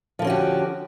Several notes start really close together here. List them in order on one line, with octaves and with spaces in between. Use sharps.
F3 D3 C#4 F#4 G4